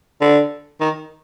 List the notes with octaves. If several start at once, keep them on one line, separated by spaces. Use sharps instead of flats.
D3
D#3